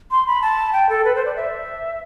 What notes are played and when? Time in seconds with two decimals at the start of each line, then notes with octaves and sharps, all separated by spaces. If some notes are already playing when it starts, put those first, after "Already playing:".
0.11 C6
0.27 B5
0.42 A5
0.73 G5
0.89 A4
1.05 B4
1.15 C5
1.25 D5
1.36 E5